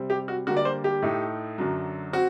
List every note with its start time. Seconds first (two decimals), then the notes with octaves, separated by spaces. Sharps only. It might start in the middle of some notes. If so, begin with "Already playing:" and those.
Already playing: C3 G3 C4
0.10 G4
0.28 F#4
0.47 D3 G3 A#3 F#4
0.57 D5
0.65 C5
0.84 G4
1.02 A2 A3 D#4
1.58 F#2 D3 F#3
2.13 C4 F#4